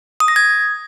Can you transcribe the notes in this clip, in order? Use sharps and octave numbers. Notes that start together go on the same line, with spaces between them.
D#6
A#6
G#6